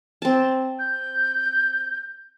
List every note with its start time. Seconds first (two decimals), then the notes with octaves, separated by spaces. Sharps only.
0.22 C4 A5
0.79 G6